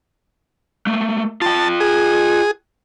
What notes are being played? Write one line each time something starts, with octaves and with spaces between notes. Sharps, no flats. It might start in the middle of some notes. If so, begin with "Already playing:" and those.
A3 A#3
F4 G5 A5
G#4